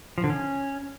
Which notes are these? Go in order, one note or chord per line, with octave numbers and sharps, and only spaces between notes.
F3
D3
C#4